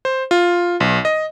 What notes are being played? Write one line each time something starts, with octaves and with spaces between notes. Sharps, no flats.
C5
F4
B1
D#5